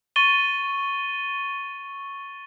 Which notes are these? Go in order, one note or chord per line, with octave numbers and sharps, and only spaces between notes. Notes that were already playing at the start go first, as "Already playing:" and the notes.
C#6 A6 D#7 G7